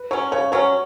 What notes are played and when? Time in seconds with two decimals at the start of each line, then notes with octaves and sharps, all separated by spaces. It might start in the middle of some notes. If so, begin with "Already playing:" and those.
Already playing: B4
0.11 F#3 C#4 C#5
0.32 C#3 C#5
0.52 F#3 C#4 C#5